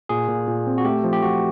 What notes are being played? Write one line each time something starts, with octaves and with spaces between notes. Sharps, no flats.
A#2 G#4
A#2
A#2
C4
F#4
A3 G4
F3
G4
F3 F#4